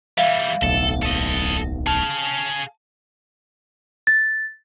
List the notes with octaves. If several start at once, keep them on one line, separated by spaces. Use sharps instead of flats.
E3 G3 E5 F5
D1 B1 A4
A4 D#5
G#4 F5 A5
A6